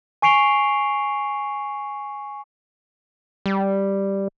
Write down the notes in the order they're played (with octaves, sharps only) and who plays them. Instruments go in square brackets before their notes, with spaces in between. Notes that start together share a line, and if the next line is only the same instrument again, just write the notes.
[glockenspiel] G#5 C#6 C7 D7 F7 G7
[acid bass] G3